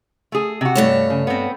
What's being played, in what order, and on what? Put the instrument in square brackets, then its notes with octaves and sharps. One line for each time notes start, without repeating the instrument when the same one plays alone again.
[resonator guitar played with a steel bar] A3 G#4
C3 F#4
[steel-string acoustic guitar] G2 A3 C#5
[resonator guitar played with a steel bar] C#3
B3 C4